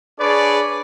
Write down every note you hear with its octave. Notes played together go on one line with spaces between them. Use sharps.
D4 G#4 B4 C#5 D5